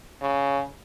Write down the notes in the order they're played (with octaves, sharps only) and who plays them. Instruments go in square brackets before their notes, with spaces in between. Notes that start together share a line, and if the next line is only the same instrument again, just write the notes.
[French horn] C#3